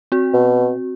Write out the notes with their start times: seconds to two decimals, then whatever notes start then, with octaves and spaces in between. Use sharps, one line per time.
0.12 C4 F#4
0.34 B2